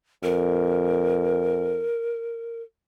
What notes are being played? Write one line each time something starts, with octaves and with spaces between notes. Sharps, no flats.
F2 A#4